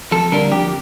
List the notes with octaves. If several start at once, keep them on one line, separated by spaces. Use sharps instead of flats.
F2 A4
D3 G3 A#3 D4 A#4
F2 G4